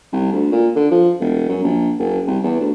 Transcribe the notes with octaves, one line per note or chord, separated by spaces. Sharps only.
C2
D2
A#2
D3
F3
E1
F#2
A#1
F#1
C2
E2
D2